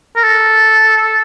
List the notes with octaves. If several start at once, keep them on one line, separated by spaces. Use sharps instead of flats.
A#4
A4